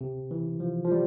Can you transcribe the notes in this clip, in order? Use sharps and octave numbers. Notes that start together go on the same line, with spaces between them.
C3
E3
F3
F3
G3